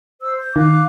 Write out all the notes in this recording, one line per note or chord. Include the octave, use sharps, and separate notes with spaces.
C5 E6
G6
D#3 F5 D6 F#6